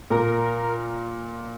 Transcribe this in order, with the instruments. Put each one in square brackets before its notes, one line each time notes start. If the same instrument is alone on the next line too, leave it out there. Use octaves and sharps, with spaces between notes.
[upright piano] A#2 [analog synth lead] A#4